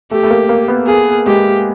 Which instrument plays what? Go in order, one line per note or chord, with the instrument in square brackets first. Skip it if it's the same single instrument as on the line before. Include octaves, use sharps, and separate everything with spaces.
[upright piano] A3 [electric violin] G4
[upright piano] A3
A#3
A#3
B3
[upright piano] A#3 [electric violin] G#4
[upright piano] G#3 [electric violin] G4